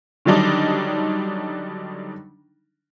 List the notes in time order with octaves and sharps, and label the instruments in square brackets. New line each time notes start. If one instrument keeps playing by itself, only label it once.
[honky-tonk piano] D3 D#3 F#3 G3 D4 D#4